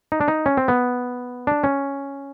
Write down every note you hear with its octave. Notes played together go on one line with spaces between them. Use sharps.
D#4
D4
D#4
C#4
C4
B3
D4
C#4